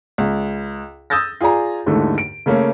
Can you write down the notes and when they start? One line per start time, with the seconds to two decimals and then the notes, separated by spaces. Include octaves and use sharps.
0.18 C#2
1.10 D#6 E6 G6 A6 A#6
1.41 F4 G#4 D5 G#5 A#5
1.86 D#2 G#2 D3 E3 A3
2.18 D7
2.46 C#3 A3 A#3 C#4